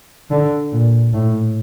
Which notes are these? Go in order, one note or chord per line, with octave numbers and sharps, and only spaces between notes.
D3
A#2
A2